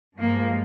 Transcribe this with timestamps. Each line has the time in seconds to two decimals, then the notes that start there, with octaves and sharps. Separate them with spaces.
0.17 G2 F3 G#3 A#3